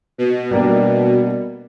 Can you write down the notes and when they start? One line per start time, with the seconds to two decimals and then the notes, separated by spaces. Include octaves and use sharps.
0.18 B2
0.51 G3 A#3 D4